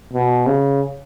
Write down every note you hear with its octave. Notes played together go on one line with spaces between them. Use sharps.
B2
C#3